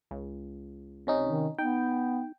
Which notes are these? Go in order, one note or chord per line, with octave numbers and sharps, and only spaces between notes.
C#2
C3 C#4 D#4
D#3
B3 D#4 G5